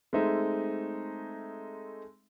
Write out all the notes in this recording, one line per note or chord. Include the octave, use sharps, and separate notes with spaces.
G#3 A3 C4 D#4 E5